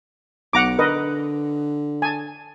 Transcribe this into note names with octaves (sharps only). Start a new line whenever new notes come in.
B1 F#5 A#5 D6
D3 A#4 B4 D#5
G#5 A5